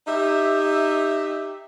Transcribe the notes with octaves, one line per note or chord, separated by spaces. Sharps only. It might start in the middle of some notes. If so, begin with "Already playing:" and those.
D#4 G4 E5